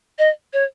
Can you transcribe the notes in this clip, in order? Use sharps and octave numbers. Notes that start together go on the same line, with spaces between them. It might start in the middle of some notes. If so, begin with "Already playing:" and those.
D#5
C#5